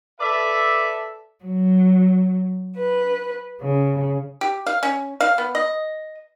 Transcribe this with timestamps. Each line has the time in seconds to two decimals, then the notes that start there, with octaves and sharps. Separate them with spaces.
0.19 A4 B4 D5 E5
1.44 F#3
2.76 B4
3.61 C#3
4.41 G4
4.67 F5
4.83 C#4
5.21 F5
5.38 B3
5.55 D#5